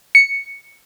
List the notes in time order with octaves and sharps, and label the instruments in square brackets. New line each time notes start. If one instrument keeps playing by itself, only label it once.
[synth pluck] C#7